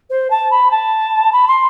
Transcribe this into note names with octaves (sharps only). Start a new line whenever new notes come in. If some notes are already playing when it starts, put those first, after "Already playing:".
C5
A5
B5
A5
B5
C6